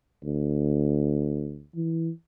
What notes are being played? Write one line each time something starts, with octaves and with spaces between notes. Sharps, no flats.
D2
E3